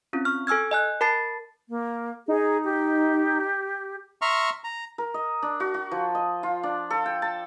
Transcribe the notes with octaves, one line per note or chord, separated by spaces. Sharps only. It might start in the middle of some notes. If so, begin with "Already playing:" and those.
C4 C#4 F4
C#6 F6
A4 G#5 E6 F6 G#6
D#5 G#5 F#6
A#4 A5 B5 A6 C7
A#3
D#4 G#4
G4
E5 A#5 C6 C#6 F6
A#5
A#4
D#5
D4
F#4
F#4
F3
D#5
F4
D4
A4
G5
A5